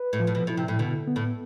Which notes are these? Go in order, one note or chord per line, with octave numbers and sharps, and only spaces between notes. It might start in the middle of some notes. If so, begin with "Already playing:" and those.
Already playing: B4
A2
F3
A2
B2
B2 E4
C3
A2
B2 D3
B3
A2